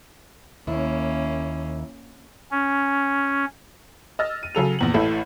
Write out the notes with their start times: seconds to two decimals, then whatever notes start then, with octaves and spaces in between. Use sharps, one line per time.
0.67 D#2 A#3 C#4 E4
2.51 C#4
4.19 D#5 E6 F6 A6 A#6
4.43 D#7
4.55 C#3 F#3 A4 F7
4.79 A#1 E2 F#7
4.94 A1 A2 E4 A4